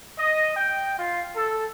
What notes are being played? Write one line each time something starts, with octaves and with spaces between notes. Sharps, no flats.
D#5
G5
F4
A4